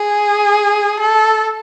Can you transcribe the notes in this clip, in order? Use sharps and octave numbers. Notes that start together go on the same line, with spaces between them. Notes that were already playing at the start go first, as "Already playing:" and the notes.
Already playing: G#4
A4